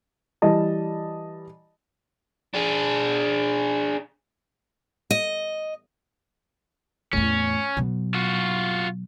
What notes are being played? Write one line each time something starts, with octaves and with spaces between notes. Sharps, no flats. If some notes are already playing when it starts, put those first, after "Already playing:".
E3 G3 D#5 A5
D4 G#4
D#5
E2 A2 C#4
B2 F#3
F4 F#4